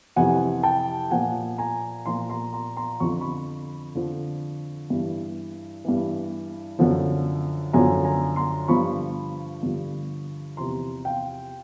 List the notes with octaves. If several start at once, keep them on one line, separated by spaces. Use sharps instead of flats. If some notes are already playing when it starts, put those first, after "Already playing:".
F2 C3 E3 F#5 G#5
G5 A5
A#2 F3 F#5 G#5
G#5 A#5
A#2 F3 A#5 C6
A#5 C6
A#5 C6
A#5 C6
F2 D3 F3 C#6
B5 C#6
F2 D3 F3
G2 E3
G2 E3
F#2 D3 F3
F#2 D3 F3 G#5 A#5
G#5 A#5
A#5 C6
G2 D3 F3 B5 C#6
G2 D3 F3
E2 C3 F3 A#5 C6
F5 G5